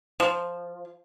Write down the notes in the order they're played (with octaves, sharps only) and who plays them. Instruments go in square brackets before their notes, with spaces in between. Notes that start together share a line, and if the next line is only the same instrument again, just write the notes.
[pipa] F3